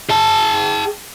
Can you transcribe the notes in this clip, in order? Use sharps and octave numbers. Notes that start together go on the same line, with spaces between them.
G#4 A5